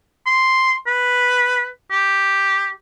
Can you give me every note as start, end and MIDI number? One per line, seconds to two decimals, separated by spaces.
0.26 0.74 84
0.87 1.68 71
1.91 2.70 67